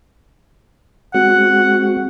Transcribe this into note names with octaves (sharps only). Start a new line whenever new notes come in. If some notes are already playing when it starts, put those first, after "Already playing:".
G#3 C4 F#4 F#5